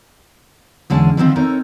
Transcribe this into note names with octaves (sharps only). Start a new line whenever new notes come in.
E2 D3 G#3 C#4 A5
D3 D#3 F3 G#3 B3 C4
C4 D#4 A4 A#4 C#5